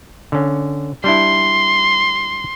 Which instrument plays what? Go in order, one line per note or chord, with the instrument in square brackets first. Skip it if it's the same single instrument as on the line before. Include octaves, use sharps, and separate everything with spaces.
[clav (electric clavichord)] D3 C#4
[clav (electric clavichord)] G3 D4 E4 [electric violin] C6